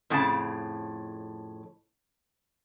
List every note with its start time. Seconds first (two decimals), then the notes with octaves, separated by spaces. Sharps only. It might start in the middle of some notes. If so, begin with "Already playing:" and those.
0.10 F2 A2 C#3 F#4 A5